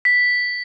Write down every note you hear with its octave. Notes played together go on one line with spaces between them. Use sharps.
B6